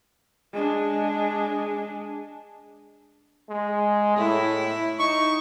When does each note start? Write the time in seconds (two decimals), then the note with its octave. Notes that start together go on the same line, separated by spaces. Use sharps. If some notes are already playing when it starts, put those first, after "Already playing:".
0.53 G#3 D4
3.49 G#3
4.17 A2 E4
4.99 D#4 C#6